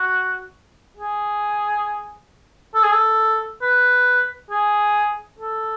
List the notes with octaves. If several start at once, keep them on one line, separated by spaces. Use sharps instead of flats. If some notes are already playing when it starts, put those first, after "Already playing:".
Already playing: F#4
G#4
A4
G#4
A4
B4
G#4
A4